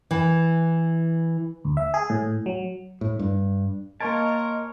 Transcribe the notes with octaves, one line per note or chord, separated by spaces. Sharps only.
E3
D2
E5
G#4
A2
F#3
A2
G2
A#3 A#4 C#5 D#5 G#5 A5 C6 D7